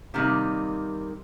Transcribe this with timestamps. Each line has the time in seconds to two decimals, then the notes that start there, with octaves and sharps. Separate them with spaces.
0.14 C3 D#3 G3 A#3 D#4